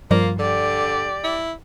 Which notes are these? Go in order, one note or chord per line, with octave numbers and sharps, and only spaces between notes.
G2 F3 G3 A#3 F4
D3 G4 D5
E4